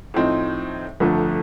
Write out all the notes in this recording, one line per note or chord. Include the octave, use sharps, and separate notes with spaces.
A2 F3 C4 D#4
G1 F2 D3 F3 A3